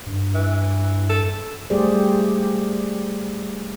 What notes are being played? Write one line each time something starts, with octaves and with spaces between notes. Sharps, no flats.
G2
E3
A4
G3 A3 G4 G#4 C5 D5